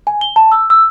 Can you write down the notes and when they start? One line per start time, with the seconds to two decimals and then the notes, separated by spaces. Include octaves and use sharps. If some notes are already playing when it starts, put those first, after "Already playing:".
0.07 G#5
0.21 G7
0.36 A5
0.52 E6
0.70 E6